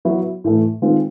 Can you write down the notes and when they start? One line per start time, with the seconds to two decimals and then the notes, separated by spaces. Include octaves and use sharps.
0.05 F#3 B3 E4
0.44 A2 E3 A3
0.82 D#3 G#3 C4 F4